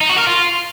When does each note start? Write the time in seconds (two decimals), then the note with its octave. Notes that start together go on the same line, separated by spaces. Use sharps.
0.01 D#4
0.09 F#4
0.18 A#4
0.27 F4